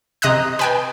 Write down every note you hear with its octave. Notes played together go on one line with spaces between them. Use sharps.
C3 D#5 A#5 D#6 F#6
B4 G5 G#5